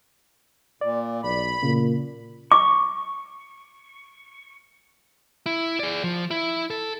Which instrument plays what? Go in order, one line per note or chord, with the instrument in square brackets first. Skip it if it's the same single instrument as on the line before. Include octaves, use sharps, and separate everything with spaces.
[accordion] A#2 [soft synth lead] D5
[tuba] B1 [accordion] B5
[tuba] A#2 [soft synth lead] C#3
[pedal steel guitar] C#6 [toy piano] D6
[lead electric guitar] E4
G#4 D5
F3
E4
A4